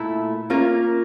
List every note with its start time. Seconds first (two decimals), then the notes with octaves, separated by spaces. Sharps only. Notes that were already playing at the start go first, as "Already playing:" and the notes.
Already playing: A#2 A3 E4
0.50 A#3 C#4 F4 A#4